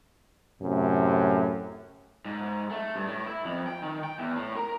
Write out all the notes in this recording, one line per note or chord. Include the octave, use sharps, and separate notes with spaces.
F#2 A2 C3
G#2
A3
G2
A2
E4
F2
G5
D#3
G5
E2
A2
A#4